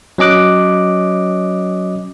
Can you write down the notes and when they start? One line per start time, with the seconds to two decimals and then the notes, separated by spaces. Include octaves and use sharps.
0.18 F#3 C#4 D#5 D6 F#6